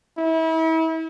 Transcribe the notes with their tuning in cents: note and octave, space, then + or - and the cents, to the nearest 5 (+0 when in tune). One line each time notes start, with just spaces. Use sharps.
E4 -35